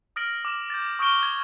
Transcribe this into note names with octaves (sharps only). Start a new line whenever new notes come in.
D#6 F6 A#6 D7 F#7
D6 F6 E7
G6 A6
C#6 D#6 F6 G6 D7 G7
G#6